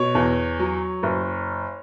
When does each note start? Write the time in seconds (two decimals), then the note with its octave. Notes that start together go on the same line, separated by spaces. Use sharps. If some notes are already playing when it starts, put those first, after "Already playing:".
Already playing: B2 C#5
0.15 E2
0.59 F#3
1.03 F#1